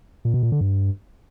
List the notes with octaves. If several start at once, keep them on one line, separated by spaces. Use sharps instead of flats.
A#2
B2
A#2
D3
G2